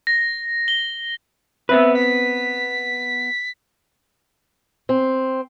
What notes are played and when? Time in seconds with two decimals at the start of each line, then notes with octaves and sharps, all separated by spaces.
0.07 A#6
0.68 G7
1.69 B3 C4 B4 E5
1.95 B6
4.89 C4